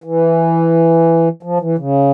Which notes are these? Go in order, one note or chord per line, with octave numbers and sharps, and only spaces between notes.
E3
F3
E3
C#3